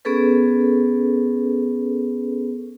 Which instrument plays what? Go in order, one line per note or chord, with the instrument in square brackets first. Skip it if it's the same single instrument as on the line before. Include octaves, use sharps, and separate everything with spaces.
[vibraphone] B3 C#4 G#4 A4 B4